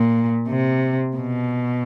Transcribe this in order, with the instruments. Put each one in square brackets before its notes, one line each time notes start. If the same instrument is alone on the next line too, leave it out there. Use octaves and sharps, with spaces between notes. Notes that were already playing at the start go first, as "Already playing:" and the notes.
Already playing: [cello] A#2
C3
B2